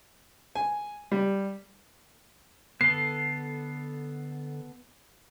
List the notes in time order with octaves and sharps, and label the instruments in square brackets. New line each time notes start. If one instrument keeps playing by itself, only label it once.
[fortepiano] G#5
G3
[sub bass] D3 [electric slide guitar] B3 A4 [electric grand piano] C7